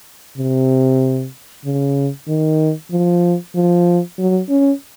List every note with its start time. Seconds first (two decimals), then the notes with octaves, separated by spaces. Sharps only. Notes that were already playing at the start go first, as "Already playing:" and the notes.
0.38 C3
1.65 C#3
2.28 D#3
2.91 F3
3.55 F3
4.18 F#3
4.49 C#4